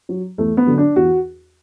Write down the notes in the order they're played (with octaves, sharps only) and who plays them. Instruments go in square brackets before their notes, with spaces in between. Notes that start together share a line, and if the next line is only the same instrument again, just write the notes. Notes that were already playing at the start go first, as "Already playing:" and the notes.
[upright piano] F#3
E2 A3
B3
D3 F#3
D4
E2 F#4